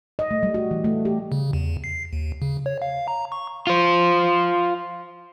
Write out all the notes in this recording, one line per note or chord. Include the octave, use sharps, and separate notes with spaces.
D#5
A3
G3
F#4
E3
A3
G4
C#3
E2
C7
D#2
C#3
C#5
F5
A#5
C#6
F4 C5